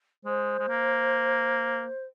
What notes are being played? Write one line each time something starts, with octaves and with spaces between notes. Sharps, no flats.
G#3 C5
G#3
A#3